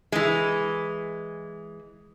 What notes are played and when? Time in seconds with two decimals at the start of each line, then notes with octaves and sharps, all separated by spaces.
0.12 E3 G#3